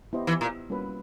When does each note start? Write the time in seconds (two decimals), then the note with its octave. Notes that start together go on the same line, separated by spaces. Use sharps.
0.13 B3 E4 G4 C5 D#5
0.27 E3
0.41 A#2
0.70 G3 A#3 C#4 F#4 B4